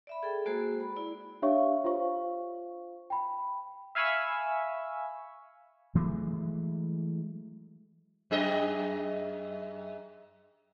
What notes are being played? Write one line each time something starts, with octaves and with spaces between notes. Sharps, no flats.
D5 E5 B5
G#4 A4 G5
G#3 A#3 F#4 G#4 C5
B5
E4 D5
D4 G4 C#5 E5 F5 C#6
F4 C5 F5 C#6
G5 B5
E5 F5 G#5 B5 C#6 E6
E3 F#3 G#3 A3
F#2 G#4 D#5